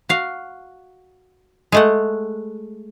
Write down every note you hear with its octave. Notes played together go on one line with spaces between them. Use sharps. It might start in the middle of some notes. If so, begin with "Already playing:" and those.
F#4 F5
G#3 A3 F#5